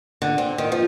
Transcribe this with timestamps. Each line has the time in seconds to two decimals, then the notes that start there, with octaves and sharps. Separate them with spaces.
0.22 D3
0.38 C4
0.58 D#3
0.72 F3